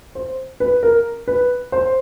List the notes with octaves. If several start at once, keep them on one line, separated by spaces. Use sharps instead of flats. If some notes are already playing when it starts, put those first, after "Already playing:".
C5
B4
A#4
B4
C5